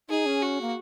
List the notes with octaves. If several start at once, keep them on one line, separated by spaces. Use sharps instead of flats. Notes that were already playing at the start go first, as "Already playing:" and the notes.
D#4 G#4
C#4
F#4
A#3